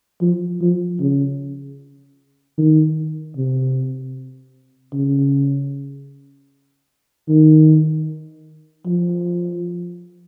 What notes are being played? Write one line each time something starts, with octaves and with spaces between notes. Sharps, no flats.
F3
F3
C#3
D#3
C3
C#3
D#3
F3